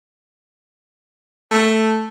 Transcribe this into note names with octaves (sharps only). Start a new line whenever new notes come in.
A3